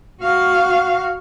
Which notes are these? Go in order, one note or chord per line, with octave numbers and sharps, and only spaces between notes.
F#4 F5